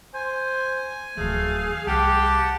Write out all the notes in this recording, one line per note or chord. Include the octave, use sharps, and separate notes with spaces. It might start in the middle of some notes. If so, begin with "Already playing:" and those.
C5 G#5
D1 E3 A3 G#4 F5
C2 G4 F#5 G5 A5